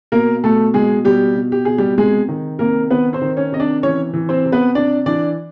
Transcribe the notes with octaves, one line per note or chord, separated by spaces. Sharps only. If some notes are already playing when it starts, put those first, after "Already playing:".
B2 A#3 A#4
B2 A3 A4
B2 G#3 G#4
B2 G3 G4
B2
G4
B2 G#4
G3 G4
C3 G#3 G#4
D#3
C3 A#3 A#4
D#3 B3 B4
C4 C5
D#3
C#4 C#5
C3 D#5
D4 D5
E3 C#4 C#5
E3
C4 C5
C3
B3 B4
C3 D4 D5
E3 D4 D5